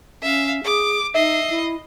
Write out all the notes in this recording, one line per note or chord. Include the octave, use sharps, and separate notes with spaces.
C#4 E5 F5
G#4 D6
D#4 D#5 E5 C7
E4